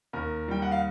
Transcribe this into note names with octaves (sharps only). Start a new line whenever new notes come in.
D#2 A#4
G3 G5
F#5
F5